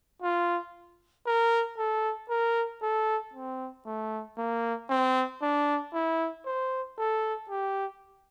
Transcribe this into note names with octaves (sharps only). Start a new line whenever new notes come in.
F4
A#4
A4
A#4
A4
C4
A3
A#3
C4
D4
E4
C5
A4
G4